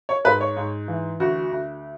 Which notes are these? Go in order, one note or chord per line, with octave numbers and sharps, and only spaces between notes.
C#5
G#2 B4
C#5
G#2
E3
D2 F#4
D2